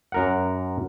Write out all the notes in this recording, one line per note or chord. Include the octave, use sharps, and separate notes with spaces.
F#2 A#4 F#5